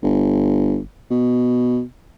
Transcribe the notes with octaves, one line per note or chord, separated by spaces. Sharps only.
G1
B2